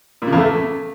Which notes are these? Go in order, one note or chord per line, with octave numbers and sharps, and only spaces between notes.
A#2
C#3
E2
A3